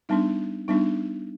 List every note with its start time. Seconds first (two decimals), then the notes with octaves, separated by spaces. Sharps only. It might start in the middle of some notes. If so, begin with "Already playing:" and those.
0.09 G3 B3 D4 D#4
0.68 G3 B3 D4 D#4